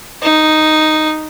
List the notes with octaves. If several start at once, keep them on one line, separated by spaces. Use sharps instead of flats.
D#4